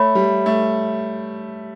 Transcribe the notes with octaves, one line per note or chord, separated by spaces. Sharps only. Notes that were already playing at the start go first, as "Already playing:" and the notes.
Already playing: A3 C#5 E5 B5
G3
A3